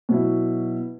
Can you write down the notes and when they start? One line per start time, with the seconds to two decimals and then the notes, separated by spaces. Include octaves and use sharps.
0.09 B2 F#3 E4